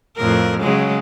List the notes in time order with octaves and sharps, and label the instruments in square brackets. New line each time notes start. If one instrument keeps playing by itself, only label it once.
[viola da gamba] F2 A2 A#4
C#3 F#3 G#3